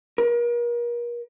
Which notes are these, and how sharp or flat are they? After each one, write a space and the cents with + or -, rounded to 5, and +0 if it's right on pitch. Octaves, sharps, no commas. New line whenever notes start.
A#4 +40